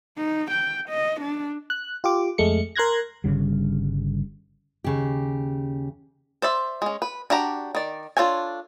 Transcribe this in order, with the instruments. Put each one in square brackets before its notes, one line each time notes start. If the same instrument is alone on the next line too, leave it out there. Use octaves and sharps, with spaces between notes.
[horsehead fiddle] D#4
G5
D#5
D4
[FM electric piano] F#6
F4 G4 D6
F2 G#3 A3 C#7
A#4 C6 F#6 G#6 A#6
[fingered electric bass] G1 C#3 G3
[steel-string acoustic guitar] D#2 C#3 G4
[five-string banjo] C5 D5 E5
G#3 C#4
B4
D4 F#4 G4 A#5
D#3 D5
D4 F4 A4 C#5 G#5